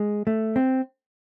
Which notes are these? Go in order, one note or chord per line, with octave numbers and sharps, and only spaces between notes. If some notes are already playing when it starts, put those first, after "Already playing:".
Already playing: G#3
A3
C4